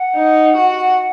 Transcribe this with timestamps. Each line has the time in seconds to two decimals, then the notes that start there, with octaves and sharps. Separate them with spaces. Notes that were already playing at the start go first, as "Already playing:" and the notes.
Already playing: F#5
0.16 D#4
0.56 F#4